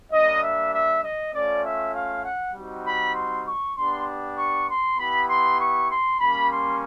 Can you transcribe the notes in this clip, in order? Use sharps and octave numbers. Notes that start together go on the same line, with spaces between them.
G3 A#3 D4 D#5
E5
E5
D#5
A3 C#4 F4 D5
E5
F5
F#5
G3 C4 D#4 F#4
B5
C6
C#6
B3 D4 G4 C6
C#6
C6
B3 E4 G4 B5
C6
C#6
C6
G3 A#3 C#4 B5
C6